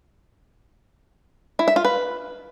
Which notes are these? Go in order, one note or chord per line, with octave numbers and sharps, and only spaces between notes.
E4
E5
F4
B4